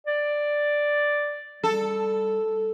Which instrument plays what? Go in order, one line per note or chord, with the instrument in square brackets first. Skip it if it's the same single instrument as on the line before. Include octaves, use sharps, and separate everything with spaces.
[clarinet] D5
[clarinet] G3 [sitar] A4